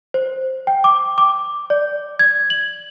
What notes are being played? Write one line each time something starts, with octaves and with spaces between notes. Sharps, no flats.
C5
G5
D6
D6
D5
G#6
F#7